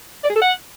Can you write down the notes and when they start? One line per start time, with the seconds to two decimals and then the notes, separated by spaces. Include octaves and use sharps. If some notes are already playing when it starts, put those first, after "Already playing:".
0.24 D5
0.30 G#4
0.36 A4
0.42 F#5